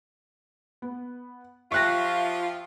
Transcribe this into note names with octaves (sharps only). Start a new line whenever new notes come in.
B3
F3 F4 G4 E5 C#6 F#6 A#6